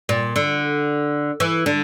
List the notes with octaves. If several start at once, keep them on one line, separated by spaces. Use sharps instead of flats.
A#2
D3
E3
D3